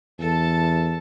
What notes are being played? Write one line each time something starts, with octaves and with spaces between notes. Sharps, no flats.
E2 A4 A5